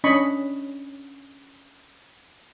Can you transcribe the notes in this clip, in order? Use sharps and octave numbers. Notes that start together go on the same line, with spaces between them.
C#4 D4 D#5 B5 C#6